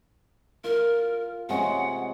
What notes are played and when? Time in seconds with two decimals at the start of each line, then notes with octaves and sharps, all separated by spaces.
0.64 F4 A#4
1.49 C3 G#3 C#4 F#5